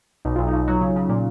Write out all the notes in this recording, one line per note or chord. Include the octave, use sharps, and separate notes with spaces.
B1 D#4
B1 F4
D#4
B1
F#3
C#3
C#3
A#2